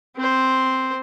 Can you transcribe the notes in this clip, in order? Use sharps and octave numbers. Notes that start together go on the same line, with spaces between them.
C4 C5